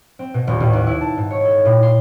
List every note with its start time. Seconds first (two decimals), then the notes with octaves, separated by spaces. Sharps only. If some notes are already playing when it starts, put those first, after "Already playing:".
0.19 C4
0.34 B2
0.47 D#1
0.60 A1
0.73 D#2
0.87 E4
1.01 A5
1.17 G#2
1.31 C#5
1.45 A4
1.65 A#2
1.83 C6